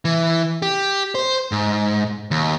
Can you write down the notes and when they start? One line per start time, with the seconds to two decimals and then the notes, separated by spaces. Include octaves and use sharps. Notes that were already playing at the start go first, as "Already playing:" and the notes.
0.05 E3
0.62 G4
1.15 C5
1.52 G#2
2.31 D#2